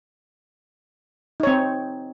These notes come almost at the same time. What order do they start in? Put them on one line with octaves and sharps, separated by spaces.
D#4 C#5 C4